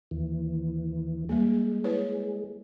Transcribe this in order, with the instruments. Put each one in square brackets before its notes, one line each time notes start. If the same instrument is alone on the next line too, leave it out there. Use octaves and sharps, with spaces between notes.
[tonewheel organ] D#2 E3
[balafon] G3 A#3 [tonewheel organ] G#3
[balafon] E4 B4 C#5